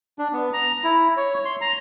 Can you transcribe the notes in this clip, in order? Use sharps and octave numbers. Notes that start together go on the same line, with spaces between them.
D4
B3
A#5
E4
C#5
C6
A#5